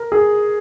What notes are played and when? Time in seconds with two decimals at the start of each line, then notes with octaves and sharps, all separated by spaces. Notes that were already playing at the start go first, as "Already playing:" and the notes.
Already playing: A#4
0.12 G#4